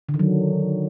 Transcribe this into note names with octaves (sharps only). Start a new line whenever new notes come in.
D3
D#3
F#3